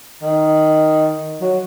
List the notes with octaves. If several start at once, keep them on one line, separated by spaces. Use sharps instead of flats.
D#3
F#3